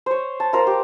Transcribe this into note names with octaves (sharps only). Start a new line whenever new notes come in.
C5 C#5
A5
F4 A#4 C5
G4